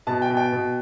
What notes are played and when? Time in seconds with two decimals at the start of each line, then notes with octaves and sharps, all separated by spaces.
0.07 B2 A5
0.22 G5
0.30 B2
0.37 G5
0.52 B2